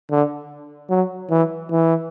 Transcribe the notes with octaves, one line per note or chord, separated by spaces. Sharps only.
D3
F#3
E3
E3